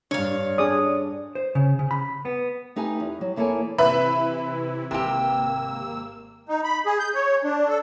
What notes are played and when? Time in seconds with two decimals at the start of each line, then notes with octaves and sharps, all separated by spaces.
0.11 G2 D4 C#5 F5
0.58 D4 G#4 D5 D#6
1.35 C5
1.55 C#3
1.79 C#3
1.91 B5
2.25 B3
2.76 A3 D#4 G4 B4 G#5
3.00 E2
3.21 F#3
3.36 E2 A#3 E4 A4 C#5 G#5
3.78 C3 E3 E4 B4 E5 B5
4.91 G#1 C3 A#3 G4 E6
6.49 D#4
6.64 B5
6.86 G#4
6.99 G6
7.15 C#5
7.44 D4
7.68 A4